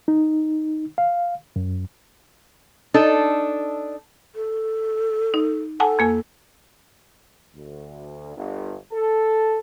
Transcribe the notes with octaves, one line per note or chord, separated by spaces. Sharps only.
D#4
F5
F#2
D4 D#4 A4
A4
D#4
A4 F#5 G#5 A5
F2 A#3 G#5
D2
G1
A4